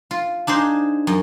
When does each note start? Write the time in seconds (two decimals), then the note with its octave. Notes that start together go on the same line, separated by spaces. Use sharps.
0.11 F4
0.47 D4 D#4 G#4 C5
1.07 F#2